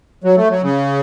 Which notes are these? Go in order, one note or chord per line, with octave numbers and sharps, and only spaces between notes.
F#3
A3
F#3
C#3